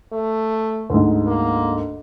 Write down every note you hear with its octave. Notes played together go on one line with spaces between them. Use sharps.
A3
D2 G#2
A#3